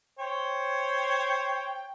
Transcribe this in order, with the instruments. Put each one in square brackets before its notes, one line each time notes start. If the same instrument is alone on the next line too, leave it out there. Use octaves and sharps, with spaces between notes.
[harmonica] C5 C#5 G5